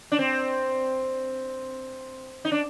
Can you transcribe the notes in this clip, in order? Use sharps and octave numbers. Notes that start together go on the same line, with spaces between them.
D4
C4
D#4
D4